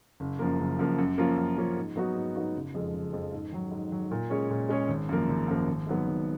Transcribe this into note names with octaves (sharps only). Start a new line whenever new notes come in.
F#1
F#2 F3 A#3
F#1
F#2 F3 A#3
F#2
F3 A#3 C#4 F4
F#2
F3 A#3 C#4 F4
G#2
F#3 B3 D#4 F#4
G#2
F#3 B3 D#4 F#4
F#1
F2 F3 G#3
F#1
F2 F3 G#3
G#2
D#3 F#3
G#2
D#3 F#3
A#2
G#3 C#4 G#4 C#5
A#2
G#3 C#4 G#4 C#5
G#1
F#2 F3 A#3
G#1
F#2 F3 A#3
G#1
G#2 F#3 B3
G#1